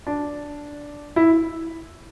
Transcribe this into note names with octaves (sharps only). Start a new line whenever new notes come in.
D4
E4